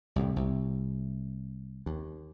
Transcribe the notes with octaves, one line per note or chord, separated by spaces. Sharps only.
C2 A2
C2
D#2